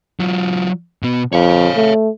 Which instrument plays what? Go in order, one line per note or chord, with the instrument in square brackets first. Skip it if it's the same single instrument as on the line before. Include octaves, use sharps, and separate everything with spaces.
[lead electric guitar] F#3 F4
B2 B3
[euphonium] F2 [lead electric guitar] C#5 F5
[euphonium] A3